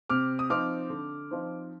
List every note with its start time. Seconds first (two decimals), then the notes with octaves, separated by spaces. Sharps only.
0.09 C3 D6 F6
0.39 D#6
0.50 F3 C4 D#4 D6 F6
0.90 D3
1.31 F3 C4 D#4